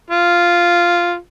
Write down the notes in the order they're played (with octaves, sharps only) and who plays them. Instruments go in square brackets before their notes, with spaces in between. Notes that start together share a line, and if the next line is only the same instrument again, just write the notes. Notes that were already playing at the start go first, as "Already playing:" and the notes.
[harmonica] F4